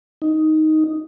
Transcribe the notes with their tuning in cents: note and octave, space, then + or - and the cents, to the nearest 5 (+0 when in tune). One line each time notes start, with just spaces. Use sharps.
D#4 +5